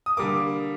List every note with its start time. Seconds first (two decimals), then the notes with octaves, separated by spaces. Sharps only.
0.06 D#6
0.17 D3 G3 A#3 D6